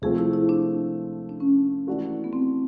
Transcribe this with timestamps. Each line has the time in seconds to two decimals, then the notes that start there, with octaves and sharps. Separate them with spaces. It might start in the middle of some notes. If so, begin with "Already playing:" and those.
0.02 C3 F3 A3 C4 G#4
0.18 E4
0.33 E4
0.49 D4
1.29 D4
1.40 C#4
1.87 E3 A3 D4 F#4 A4
2.24 B3
2.33 C4